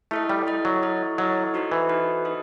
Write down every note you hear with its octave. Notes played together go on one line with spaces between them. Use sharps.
A3 E4 A4 D#5
G3
E4 A4 D#5
F#3
E4 A4 D#5
F#3 E4 A4 D#5
D#4 F#4 A4 C5 D#5
E3
D#4 F#4 A4 C5 D#5
D#4 F#4 A4 C5 D#5